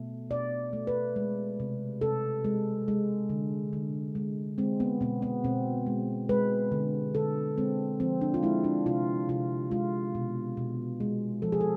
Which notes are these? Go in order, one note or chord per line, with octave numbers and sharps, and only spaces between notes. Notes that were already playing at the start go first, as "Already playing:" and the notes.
Already playing: B2 A3
B2 D5
A3
B4
G#3
C3
C3 A4
G#3
G#3
D3
D3
G#3
G#3 C4
B3
B2 B3
B3
B2 C4
G#3
G#3 B4
D3
D3 A4
G#3 C4
F3 C4
D4
F4
G#3 E4
D4
C3 F4
C3 F4
G#3 F4
B2
B2
G#3
F3 A4
G#4
A4